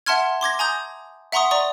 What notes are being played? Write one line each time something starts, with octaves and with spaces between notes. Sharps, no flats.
E5 F#5 A5 C6 F6 G#6
C6 D6 G#6 A#6
G#5 A#5 D#6 G6
E5 F#5 A#5 C6 C#6 D#6
D5 A#5 C#6 D#6